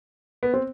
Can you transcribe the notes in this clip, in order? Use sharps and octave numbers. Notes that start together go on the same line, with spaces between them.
B3
C4